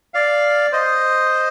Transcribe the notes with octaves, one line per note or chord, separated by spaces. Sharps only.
D5 F5
C5 D#5